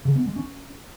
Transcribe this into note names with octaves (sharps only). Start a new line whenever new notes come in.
C#3
B3
G#3
C#4